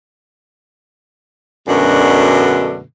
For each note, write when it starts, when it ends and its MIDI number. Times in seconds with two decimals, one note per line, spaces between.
1.68 2.81 42
1.68 2.81 47
1.68 2.81 50
1.68 2.81 56
1.68 2.81 57
1.68 2.81 62